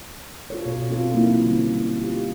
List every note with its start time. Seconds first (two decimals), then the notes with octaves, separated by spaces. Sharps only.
0.50 F4 A4 C#5
0.66 B2
0.90 C4 F4 A4
1.14 F#3 A#3 C4 D#4 E4
1.46 D3 G3 C#4
2.01 F4 G4